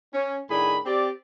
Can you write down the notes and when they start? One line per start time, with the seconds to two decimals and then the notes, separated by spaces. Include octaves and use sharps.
0.13 C#4
0.50 A2 D#3 D4 G#4 G#5 B5
0.85 C4 G4 D5